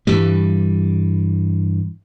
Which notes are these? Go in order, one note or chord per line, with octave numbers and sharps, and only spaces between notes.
G2 E3 G3